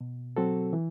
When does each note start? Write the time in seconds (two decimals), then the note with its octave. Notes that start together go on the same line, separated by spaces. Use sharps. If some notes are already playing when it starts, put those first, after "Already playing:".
0.01 B2
0.36 F#3 C4 F#4 A4
0.73 E3